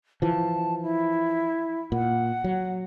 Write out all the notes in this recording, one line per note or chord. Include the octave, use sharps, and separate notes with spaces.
E3 F3 A5
E4
A#2 F#5
F#3